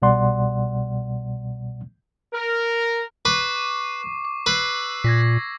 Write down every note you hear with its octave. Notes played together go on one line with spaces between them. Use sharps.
C2 B2 G3 D5 F#5 C6
A#4
B4 C#6 D6 C7
D6
B4 E6 C7
A#2 G#6 A#6 B6